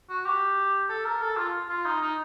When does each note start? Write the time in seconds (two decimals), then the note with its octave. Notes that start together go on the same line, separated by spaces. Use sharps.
0.09 F#4
0.26 G4
0.89 A4
1.05 A#4
1.22 A4
1.37 F4
1.69 F4
1.86 D#4
2.01 D#4